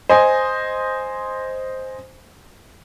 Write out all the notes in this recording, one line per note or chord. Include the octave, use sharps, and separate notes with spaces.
C5 D#5 G#5